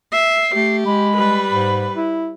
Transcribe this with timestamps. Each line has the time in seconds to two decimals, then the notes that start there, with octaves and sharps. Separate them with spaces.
0.12 E5 C7
0.55 A3 G4
0.86 G#3 B5
1.17 G3 B4
1.52 G#2
1.95 E4